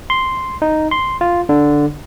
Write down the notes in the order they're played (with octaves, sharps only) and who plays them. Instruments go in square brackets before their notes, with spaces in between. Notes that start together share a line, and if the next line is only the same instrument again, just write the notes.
[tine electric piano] C6
D#4
C6
F4
D3